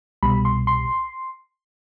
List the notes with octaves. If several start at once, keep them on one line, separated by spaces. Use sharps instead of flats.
C2 B2 G3 B5
C6
C6